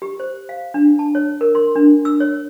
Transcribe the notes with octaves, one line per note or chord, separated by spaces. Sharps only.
G4
C5
F5
D4
A5
C#5
A#4
C6
D4
E6
C#5